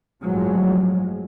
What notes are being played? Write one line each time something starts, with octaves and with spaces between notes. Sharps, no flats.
A1 G2 F3 F#3 G#3